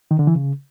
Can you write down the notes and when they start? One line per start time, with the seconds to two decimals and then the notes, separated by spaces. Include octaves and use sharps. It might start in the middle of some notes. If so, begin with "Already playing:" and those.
0.11 D#3
0.19 D3
0.27 E3
0.35 C#3